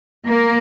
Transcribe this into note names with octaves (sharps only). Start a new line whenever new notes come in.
A#3